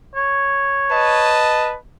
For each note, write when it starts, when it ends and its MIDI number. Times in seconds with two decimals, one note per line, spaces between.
0.15 1.44 73
0.91 1.77 71
0.91 1.77 75
0.91 1.77 81